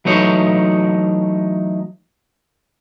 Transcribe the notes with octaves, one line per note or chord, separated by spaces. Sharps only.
E3 F#3 A3 D#4 C#5